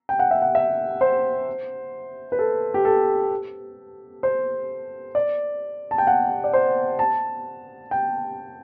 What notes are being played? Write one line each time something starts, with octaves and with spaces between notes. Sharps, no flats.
G5
F#5
E5
F#5
E5
C5
B4
A4
G4
A4
C5
D5
A5
G5
F#5
D5
C5
A5
G5